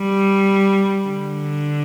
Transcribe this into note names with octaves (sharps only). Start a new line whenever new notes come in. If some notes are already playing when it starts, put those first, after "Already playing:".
Already playing: G3
D3